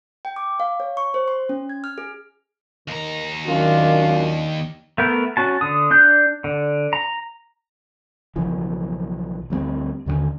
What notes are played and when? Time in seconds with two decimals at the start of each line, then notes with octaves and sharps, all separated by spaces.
0.25 G5
0.36 D6
0.60 F5
0.80 C#5
0.97 C#6
1.14 C5
1.28 C6
1.49 C#4
1.69 G#6
1.84 F6
1.98 G#4
2.88 D#2 D#3 A#5
3.47 F#2 D#3 D4 F4
4.98 A3 B3 A#4
5.37 C#4 F#4 A5
5.61 D3 D#6
5.91 D4 F#6 G6
6.44 D3
6.93 A#5
8.36 B1 C#3 E3 F3
9.50 D2 G3 A3 C4
10.06 D#2 D3 A3 C#4